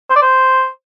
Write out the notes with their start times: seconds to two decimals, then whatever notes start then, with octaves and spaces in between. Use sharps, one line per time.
0.10 C5
0.16 D5
0.22 C5